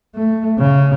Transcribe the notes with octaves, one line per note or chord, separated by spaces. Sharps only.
A3
C#3